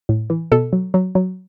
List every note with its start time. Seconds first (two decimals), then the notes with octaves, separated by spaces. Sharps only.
0.09 A2
0.30 E3
0.52 B2 A4
0.73 F#3
0.94 F#3
1.15 F#3